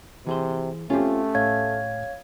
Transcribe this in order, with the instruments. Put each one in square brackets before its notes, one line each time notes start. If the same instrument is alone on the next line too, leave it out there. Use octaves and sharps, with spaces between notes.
[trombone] C3 [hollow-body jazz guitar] E3 G#4 C5
[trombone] A3 [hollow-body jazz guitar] C4 F4 [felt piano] C#4 G4
[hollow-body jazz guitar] A2 [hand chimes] C#5 F5 G#6